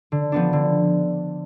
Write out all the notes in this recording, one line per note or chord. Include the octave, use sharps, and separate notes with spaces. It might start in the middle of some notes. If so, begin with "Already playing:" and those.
D3
F3 B3 D4
D3